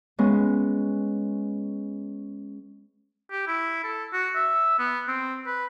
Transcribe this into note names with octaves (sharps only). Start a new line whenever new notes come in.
G#3 B3 C#4
G4
E4
A4
F#4
E5
B3
C4
B4